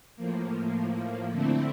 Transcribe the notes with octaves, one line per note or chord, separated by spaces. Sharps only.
A2 F3 A#3
D3 A3 C4 E4